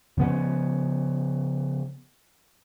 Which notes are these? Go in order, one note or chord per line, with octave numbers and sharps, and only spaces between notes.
C#3 F3 B3 C#4